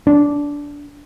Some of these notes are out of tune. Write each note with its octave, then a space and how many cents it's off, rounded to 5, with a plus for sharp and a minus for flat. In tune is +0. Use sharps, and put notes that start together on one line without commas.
D4 -15